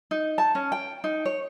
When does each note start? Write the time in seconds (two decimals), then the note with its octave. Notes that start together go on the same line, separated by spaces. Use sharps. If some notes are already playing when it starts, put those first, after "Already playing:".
0.11 D#4
0.38 A5
0.55 C#4
0.72 G5
1.04 D#4
1.25 C#5